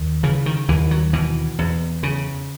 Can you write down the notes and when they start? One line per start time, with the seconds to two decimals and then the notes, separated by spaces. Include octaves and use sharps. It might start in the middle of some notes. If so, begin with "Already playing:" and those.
Already playing: D#2
0.23 C#3 E3
0.46 D#3
0.68 D#2 E3
0.91 F#3
1.13 B2 E3
1.59 E2
2.03 C#3